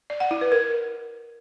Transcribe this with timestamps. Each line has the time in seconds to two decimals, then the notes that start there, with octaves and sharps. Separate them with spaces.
0.10 D5
0.20 F#5
0.31 E4
0.41 B4
0.52 A#4